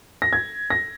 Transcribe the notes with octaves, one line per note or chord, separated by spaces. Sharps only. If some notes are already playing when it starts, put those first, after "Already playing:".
A#6
G#6
A#6